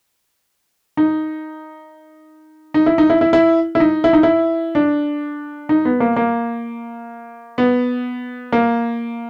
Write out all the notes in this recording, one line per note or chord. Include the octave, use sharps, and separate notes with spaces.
D#4
D#4
E4
D#4
E4
E4
E4
E4
D#4
E4
D#4
E4
D4
D#4
B3
A#3
A#3
B3
A#3